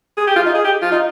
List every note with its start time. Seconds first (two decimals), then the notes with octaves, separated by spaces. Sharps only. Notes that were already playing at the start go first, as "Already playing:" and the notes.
0.17 G#4
0.27 G4
0.36 F4
0.46 D#4
0.54 G#4
0.65 G4
0.82 F4
0.92 D#4